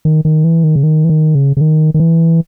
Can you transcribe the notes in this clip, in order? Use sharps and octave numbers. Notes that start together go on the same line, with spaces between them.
D#3
D#3
E3
D#3
C#3
D#3
E3
D#3
C#3
C#3
D#3
D#3
E3